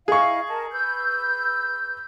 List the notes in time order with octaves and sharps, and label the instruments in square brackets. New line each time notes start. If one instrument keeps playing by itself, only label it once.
[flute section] E4 D#5 F5 [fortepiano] G#4 C#6
[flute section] A#4 D#5 A5
B4 E6 G6